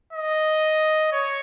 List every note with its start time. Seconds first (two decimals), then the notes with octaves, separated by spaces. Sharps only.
0.13 D#5
1.12 C#5